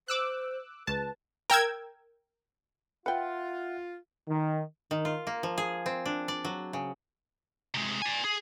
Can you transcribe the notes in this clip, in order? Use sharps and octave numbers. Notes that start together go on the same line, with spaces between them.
C5 D6 E6 F#6
C#2 B4 A5
A#4 G5 E6 G#6
F4 B4 E5 F#5 G5
D#3
D#3
F4
A#3
F3
G#4
C4
D4
D5
F#3
C#3
C3 G#3
D5 G#5
G#4